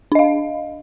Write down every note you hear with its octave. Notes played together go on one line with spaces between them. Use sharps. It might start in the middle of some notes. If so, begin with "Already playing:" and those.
D4 D#5 F5